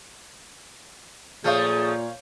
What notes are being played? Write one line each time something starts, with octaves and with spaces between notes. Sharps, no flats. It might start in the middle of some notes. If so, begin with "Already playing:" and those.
A#2 F3 A3 G#4 C#5 F5 G6